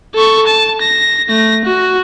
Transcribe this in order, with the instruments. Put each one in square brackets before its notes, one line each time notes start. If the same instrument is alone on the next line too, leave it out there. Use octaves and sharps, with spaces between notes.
[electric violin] A4 C#6
A5
A#6
A3 A#6
F#4